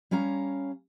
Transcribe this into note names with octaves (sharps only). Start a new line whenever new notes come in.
G3 C#4 C#5 F5 A#5